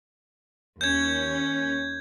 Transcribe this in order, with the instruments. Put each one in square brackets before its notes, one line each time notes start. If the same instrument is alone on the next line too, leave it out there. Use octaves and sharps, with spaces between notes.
[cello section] D#2 C#4 [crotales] G6 G#6